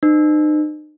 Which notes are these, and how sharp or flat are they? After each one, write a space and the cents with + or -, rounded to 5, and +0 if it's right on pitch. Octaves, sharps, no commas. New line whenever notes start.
D#4 -40 C5 -45